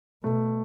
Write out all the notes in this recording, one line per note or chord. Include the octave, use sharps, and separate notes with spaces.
B2 A3